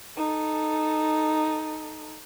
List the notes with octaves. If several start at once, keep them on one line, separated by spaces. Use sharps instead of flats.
D#4 A4